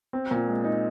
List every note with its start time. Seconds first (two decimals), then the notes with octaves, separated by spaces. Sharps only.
0.13 C4
0.31 A#2
0.48 G#3
0.64 D#4